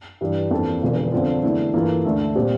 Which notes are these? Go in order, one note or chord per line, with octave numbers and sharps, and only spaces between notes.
G2 E3 G3
F2 E3 A#3 D4 A4
E1 E2 D3 F3
F2 D3 F3 C4 F4
E2 D3 A3 E4
G2 E3 A#3 F4 A4
D2 D3 A3
A#2 G3 C4 G4